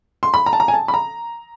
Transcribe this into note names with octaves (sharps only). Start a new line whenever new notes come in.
C6
B5
A#5
A5
A#5
G#5
A5
B5
A#5